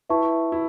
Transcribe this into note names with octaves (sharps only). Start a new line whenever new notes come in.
E4 B4 E5 A5 C#6
E4